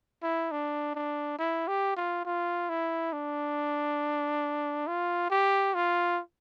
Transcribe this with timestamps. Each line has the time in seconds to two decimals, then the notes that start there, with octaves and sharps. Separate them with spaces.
0.23 E4
0.51 D4
0.95 D4
1.39 E4
1.68 G4
1.96 F4
2.25 F4
2.69 E4
3.13 D4
4.87 F4
5.30 G4
5.75 F4